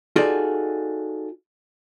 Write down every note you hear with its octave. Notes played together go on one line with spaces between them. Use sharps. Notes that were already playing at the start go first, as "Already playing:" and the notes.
D#4 F4 F#4 G#4 A4 D5